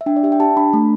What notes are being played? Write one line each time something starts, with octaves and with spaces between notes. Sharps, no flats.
E5
D4 G5
D5
G4 E5
G5
G4 A5
D4 B5
A3